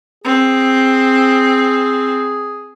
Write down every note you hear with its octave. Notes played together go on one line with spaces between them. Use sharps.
C4 G#4